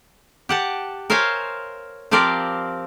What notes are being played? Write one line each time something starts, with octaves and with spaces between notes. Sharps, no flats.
G4 F#5 A5
A#4 C5 C#5 E5 F5 G#5
F3 C4 G4 A#4 D5 F5